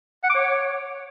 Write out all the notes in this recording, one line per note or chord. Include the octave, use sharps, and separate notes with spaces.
F#5
D6
C#5